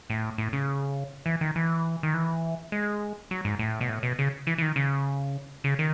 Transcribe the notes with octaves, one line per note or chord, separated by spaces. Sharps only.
A2
A2
C#3
E3
D#3
E3
D#3
E3
G#3
F#3
G#2
A2
B2
A2
B2
C#3
E3
E3
D#3
C#3
C#3
D#3